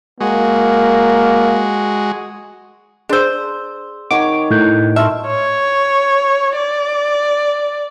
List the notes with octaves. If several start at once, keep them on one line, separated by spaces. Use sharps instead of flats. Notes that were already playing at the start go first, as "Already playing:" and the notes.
G#3 A#3 F#4
D4 G#4 C5 C6 E6
D#3 C#5 F#5 D6
A2 E4 F#6 G6
A3 E5 A5 C6 D6 F6
C#5
D5